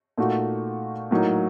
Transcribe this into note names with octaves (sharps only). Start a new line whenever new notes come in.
A#2 A3 D#4 F#4
A2 F#3 A#3 D#4